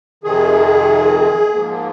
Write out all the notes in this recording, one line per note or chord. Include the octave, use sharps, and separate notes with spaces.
F2 C3 D#3 G#4
G#2 F3 A#3
A#3